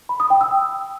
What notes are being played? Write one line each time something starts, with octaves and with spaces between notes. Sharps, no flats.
B5
D#6
G5
E6